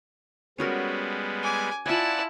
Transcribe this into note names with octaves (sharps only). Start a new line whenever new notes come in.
G3 G#3 B3 C#4 F#4 A#4
G#5 D6
E4 F4 D5 F#5 G#5 A5